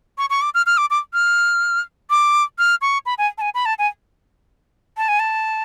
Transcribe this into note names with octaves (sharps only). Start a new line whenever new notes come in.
C#6
C#6
D6
F6
F6
D6
D6
F6
D6
F6
C#6
B5
G#5
A5
G#5
B5
A5
G#5
A5
G#5
A5